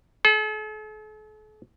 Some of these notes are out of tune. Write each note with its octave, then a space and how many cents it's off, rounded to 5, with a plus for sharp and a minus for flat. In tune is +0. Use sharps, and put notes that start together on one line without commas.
A4 -45